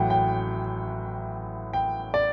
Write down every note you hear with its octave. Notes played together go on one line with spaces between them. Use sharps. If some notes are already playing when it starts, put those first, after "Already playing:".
Already playing: A1 A2 F#3 F#5 G5
G5
G5
D5